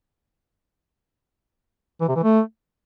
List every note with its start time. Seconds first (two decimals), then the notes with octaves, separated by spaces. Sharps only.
2.01 E3
2.08 C3
2.16 E3
2.24 A3